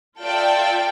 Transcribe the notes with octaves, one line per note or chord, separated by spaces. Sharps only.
F4 A4 D5 E5 G5